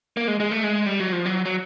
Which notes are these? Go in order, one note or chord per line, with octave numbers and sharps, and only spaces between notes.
A#3
G#3
G#3
A3
G#3
G3
F#3
F3
F#3
F#3